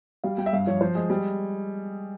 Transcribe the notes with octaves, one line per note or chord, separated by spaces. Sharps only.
G3 F5
G3 G5
E5
G2 F5
F3 C#5
F3 C5
G#3 G#4
G3